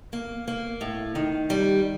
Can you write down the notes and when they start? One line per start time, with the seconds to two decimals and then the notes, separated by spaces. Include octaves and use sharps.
0.13 A#3
0.48 A#3
0.81 A2
1.15 D#3
1.50 G3